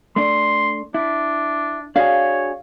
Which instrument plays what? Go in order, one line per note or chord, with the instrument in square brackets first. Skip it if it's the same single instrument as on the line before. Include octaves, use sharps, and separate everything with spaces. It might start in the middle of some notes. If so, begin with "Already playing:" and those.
[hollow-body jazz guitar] A3 D4 [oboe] C6
[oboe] D4 [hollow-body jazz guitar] E4
[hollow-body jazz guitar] D4 F#4 G#4 [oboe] C#5 [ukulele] F5